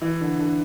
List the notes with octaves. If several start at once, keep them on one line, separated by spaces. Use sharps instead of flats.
E3
D3
D3